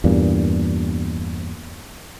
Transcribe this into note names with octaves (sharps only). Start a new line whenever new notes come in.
E2 G2 A#2